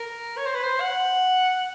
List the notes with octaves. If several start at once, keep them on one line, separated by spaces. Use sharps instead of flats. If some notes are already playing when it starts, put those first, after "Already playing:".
Already playing: A#4
C#5
C5
B4
C5
F#5